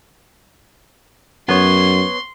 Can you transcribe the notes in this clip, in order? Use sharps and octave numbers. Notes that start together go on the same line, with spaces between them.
F#2 B3 C#5 C6